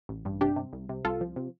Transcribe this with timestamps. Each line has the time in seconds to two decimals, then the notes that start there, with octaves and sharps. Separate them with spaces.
0.09 A1
0.25 G2
0.41 C3 D4 G4
0.56 C3
0.73 C2
0.89 C3
1.05 C2 F4 A4
1.21 F3
1.36 C3